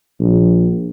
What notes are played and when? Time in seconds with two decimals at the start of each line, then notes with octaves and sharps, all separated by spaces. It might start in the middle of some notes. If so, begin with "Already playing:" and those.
0.19 A#1